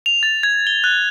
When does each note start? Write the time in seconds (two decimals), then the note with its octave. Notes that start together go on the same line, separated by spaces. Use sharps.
0.06 F7
0.23 A6
0.43 G#6
0.67 G7
0.84 F#6